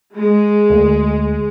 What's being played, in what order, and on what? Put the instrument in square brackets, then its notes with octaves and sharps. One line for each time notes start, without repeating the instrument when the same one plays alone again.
[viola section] G#3
[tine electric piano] D2